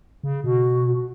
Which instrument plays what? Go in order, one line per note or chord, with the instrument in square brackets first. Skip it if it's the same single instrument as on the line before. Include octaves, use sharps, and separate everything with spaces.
[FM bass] C#3
[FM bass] B2 [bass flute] F#4